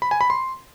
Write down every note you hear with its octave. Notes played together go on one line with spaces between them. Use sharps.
B5
G#5
B5
C6